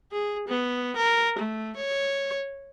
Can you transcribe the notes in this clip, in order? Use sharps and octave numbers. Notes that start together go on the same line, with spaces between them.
G#4
B3
A#4
A3
C#5